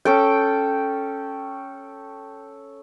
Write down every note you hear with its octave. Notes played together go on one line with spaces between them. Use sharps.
C#4 A4 G5